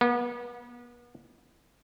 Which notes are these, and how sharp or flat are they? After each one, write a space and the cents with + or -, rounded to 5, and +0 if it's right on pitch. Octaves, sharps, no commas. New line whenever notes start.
B3 -35